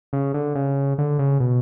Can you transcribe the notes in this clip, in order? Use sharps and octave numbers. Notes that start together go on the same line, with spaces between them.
C#3
D3
C#3
D3
C#3
B2